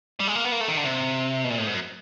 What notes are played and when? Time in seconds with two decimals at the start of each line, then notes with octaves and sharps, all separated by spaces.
0.20 G3
0.28 G#3
0.36 A#3
0.44 B3
0.52 A#3
0.61 A3
0.68 D#3
0.77 D3
0.84 C3
1.44 B2
1.50 A#2
1.58 A2
1.67 G#2
1.74 F#2